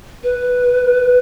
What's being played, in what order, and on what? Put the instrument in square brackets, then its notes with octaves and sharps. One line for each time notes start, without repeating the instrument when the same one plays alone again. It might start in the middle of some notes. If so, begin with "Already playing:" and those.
[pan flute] B4